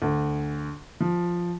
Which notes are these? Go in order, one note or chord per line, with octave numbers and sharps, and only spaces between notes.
D2
F3